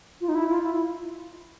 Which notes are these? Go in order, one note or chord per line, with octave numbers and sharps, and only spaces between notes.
F4
D#4
E4
F4
E4